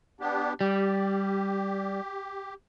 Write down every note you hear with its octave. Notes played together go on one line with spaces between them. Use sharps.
B3 D4 G4
G3 G4